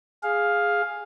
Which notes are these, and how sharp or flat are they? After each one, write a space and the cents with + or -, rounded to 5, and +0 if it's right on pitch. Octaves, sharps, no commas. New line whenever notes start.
G#4 +0 F5 +10